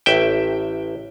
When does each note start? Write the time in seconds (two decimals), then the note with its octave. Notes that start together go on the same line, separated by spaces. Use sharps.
0.06 A1 E5 G5